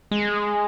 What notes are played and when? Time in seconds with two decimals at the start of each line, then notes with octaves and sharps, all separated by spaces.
0.11 G#3